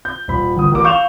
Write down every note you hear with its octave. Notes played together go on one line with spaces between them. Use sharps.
G6
D#1 B5
G1 D#6
A1 A#4 D6
F5 C#6 G6 E7 F7